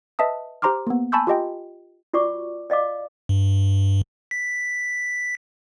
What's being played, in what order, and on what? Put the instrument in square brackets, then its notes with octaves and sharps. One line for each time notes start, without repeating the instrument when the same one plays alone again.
[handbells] B4 D#5 E5 A5 D#6
G4 C5 A#5 C6 D6 F6
A#3 B3
G#5 A5 B5 C#6 E6 G6
F4 G4 D#5 G5
[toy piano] F4 F#4 D5 C#6 D6
D5 D#5 F5 D6
[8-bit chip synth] G2
B6